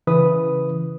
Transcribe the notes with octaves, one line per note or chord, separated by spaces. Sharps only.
C#3 E3 B4 D#6